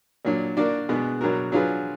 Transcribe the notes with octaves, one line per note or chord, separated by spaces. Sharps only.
A#2 F#3 D4
A#3 D4 F#4 D5
B2 G#3 B3 D4
B2 F#3 D4 F#4 A#4
F#3 D4 F4 G#4 B4